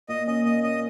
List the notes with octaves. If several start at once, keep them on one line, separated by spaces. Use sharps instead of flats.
A#2 D#5
C#4 D#5
A#2 D#5
C#4 D#5